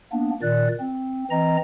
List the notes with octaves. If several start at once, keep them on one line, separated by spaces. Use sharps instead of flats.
A#3 B3 D4
A#2 D#3 D5 F#6
C4
E3 C4 D#5 A#5